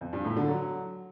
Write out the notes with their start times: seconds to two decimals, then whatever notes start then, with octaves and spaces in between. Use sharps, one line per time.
0.01 F2
0.13 G2
0.25 A2
0.37 D3
0.48 F#3